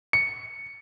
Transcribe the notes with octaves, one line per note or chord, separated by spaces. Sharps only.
C#7